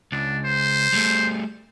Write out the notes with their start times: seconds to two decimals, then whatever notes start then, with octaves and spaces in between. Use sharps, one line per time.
0.12 C#2 D4
0.45 C5
0.93 G3 A3